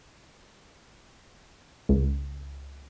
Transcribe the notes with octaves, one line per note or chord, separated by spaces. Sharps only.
C#2